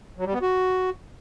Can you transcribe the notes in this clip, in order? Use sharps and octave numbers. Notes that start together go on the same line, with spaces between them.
F#3
G3
B3
F#4